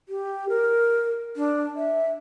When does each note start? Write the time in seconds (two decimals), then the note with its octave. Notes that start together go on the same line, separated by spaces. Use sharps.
0.09 G4
0.49 A#4
1.36 D4
1.76 E5